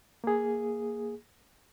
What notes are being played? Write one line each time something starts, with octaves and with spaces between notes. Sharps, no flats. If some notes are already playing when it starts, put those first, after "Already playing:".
A#3 G#4